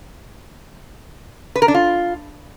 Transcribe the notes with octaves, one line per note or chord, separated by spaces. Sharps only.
B4
A#4
D4
F4